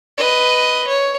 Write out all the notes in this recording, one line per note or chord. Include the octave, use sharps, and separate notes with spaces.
B4 D#5
C#5